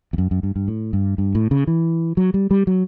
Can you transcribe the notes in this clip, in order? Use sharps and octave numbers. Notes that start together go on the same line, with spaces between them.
E2
F#2
F#2
G2
G2
A2
G2
G2
A2
C#3
E3
F#3
G3
G3
F#3